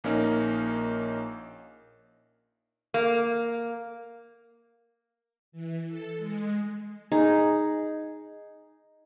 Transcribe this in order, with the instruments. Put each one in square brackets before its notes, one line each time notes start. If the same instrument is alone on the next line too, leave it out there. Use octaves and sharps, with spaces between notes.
[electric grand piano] A#1 A#3 C#4 D#4 A#4
[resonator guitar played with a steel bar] A#3
[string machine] E3
A4
G#3
[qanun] D#4 G#4